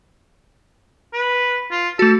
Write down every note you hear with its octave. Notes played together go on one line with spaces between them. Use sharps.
B4
F4
A3 F#4 A4